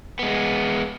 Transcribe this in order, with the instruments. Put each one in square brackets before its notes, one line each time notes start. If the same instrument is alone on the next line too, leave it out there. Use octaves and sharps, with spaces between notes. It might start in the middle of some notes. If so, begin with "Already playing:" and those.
[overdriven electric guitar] G#3 B3